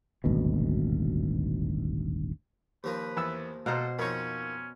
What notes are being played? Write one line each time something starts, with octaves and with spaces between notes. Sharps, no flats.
D#1 G#1 D2 B2
D#2 F3 A#3 B4
E2 B3 E6
B2 A4 C5 F5 F#5 A#5
F2 A#3 C#4 D#4 C#5